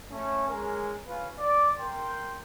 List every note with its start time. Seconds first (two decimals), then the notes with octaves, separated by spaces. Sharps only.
0.11 A3 C#4
0.47 G#3 C#4 A#4
1.07 C#4 F4 B4
1.37 D5
1.78 A#4 G5 C6